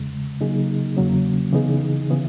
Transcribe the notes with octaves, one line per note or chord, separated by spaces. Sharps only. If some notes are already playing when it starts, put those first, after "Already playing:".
Already playing: E2 C#3 G#3
C#3 F#3 A#3 D#4 G#4
E2 C#3 F#3 A#3 C#4
C#3 E3 B3 D#4 G#4
C#3 E3 B3 E4